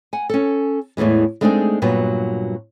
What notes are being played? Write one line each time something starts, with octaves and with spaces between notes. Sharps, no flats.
F#5 G#5
C#4 A4
E2 A2 C3 E3 G#3
G#3 A3 C4 D4 D#4 G#4
G2 A#2 F#3 B3